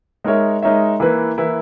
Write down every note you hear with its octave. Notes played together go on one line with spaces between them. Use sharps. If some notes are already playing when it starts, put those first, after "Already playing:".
G#3 D#4 A#4 C#5 E5
G#3 D#4 A#4 C#5 E5
E3 A#3 E4 B4
E3 A#3 E4 B4